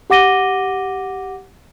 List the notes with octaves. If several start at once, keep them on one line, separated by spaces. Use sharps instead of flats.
G4 F#5 D6 A#6 D#7 G7